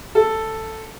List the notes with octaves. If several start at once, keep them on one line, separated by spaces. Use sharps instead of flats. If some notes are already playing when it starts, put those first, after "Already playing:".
A4